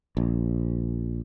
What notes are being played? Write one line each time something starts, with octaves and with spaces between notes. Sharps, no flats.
A#1